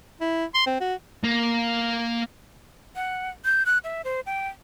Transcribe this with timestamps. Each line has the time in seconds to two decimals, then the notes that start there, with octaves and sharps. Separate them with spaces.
0.21 E4
0.54 C6
0.67 C4
0.81 F#4
1.24 A#3
2.96 F#5
3.45 G6
3.66 F#6
3.84 E5
4.05 C5
4.26 G5